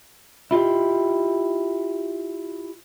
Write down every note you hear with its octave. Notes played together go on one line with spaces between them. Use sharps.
E4 F4 G4 D#5